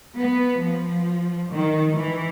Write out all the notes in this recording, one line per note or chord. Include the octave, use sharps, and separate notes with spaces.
B3
F3
D#3
E3